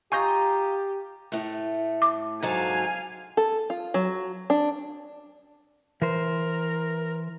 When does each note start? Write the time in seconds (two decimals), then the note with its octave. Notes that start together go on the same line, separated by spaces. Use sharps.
0.12 F4 G4 D#5 G#5 A#5 C#6 G6
1.32 A2 A3
2.02 D6
2.42 G#2 F#3 A4 F5 G#5
3.37 A4
3.70 F4
3.94 F#3
4.50 D4
6.02 E3 A#4 C5